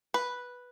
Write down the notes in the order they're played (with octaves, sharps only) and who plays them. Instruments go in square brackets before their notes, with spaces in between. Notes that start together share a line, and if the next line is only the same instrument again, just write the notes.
[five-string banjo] B4